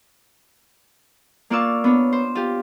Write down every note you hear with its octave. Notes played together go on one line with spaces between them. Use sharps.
A#3 F4 D5 F5 C#6 E6
B3 D4 C#5
C5
F4 G4